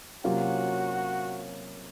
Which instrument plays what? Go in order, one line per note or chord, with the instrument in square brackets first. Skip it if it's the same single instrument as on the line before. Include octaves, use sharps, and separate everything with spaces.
[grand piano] C3 F#3 A#3 C#4 F4 [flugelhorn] F#4